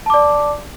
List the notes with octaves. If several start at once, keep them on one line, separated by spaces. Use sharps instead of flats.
D5 A5 D6